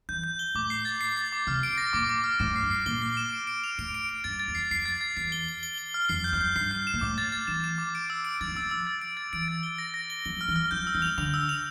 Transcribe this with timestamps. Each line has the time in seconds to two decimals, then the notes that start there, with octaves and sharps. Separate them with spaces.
0.09 E3 G6
0.24 G6
0.39 G7
0.55 A2 D6
0.70 C7
0.85 A6
1.01 C7
1.17 A6
1.32 D6
1.47 C3 F6
1.63 D7
1.78 A#6
1.93 A#2 D6
2.09 D6
2.24 F6
2.39 A2 E7
2.56 C7
2.63 G2
2.71 C7
2.86 A#2 G7
3.02 C7
3.17 E7
3.32 D7
3.47 D7
3.64 F7
3.78 A2 D7
3.94 D7
4.09 D7
4.24 G2 A6
4.40 A6
4.48 E2
4.55 C7
4.71 F2 C7
4.86 A6
5.01 A6
5.17 E2 C7
5.32 G7
5.48 G7
5.63 G7
5.78 G7
5.94 F6
6.09 F2 C7
6.24 G6
6.33 F2
6.41 G6
6.56 G2 C7
6.71 G6
6.87 E7
6.94 A#2
7.01 A2 D6
7.18 A6
7.32 A6
7.47 E3 E7
7.64 E7
7.78 D6
7.95 D7
8.10 E6
8.24 D7
8.41 F3 A6
8.48 E3
8.55 F3 E6
8.71 E6
8.87 A6
9.01 D7
9.17 A6
9.33 E3 D7
9.48 A6
9.63 G7
9.78 A#6
9.94 A#6
10.10 G7
10.25 F3 G7
10.41 F6
10.48 E3
10.56 F6
10.71 F3 G6
10.87 E6
10.95 E3
11.02 F7
11.18 D3 F7
11.34 E6
11.49 F7